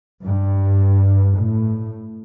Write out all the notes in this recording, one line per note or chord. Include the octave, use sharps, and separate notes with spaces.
G2
A2